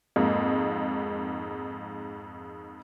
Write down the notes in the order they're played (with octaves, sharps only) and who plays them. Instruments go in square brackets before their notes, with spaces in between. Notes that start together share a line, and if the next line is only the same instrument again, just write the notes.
[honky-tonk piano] F2 G#2 A#3